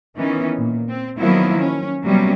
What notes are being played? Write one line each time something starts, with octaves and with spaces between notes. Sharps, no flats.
D#3 E3 B3 C#4 D#4
A#2
C4
D#3 F3 F#3 A#3 B3 E4
C#4
C3 F#3 G3 A#3 B3 C#4